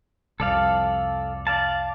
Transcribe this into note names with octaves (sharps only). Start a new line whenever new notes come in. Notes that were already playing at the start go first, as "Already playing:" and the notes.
C2 F2 A4 D5 F5
D5 F5 A5